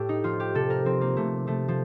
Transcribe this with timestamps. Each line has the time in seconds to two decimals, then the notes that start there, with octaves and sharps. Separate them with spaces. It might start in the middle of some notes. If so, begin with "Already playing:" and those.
Already playing: A2 G4 A4
0.09 D#4
0.24 F3 F4
0.40 G4
0.54 C3 A4
0.70 A#4
0.85 F3 C4
1.01 A#3
1.16 C3 A3
1.47 F3 A3
1.68 F3